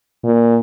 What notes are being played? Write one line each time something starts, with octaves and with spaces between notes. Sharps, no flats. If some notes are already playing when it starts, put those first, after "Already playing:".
A#2